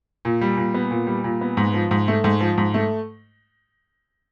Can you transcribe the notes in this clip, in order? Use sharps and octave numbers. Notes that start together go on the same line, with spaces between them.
A#2
G3
A#2
B3
A#2
G3
A#2
B3
G#2
F3
G#2
A3
G#2
F3
G#2
A3